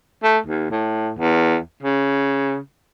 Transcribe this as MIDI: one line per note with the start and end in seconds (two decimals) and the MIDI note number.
0.24 0.38 57
0.47 0.69 39
0.71 1.11 45
1.19 1.58 40
1.83 2.57 49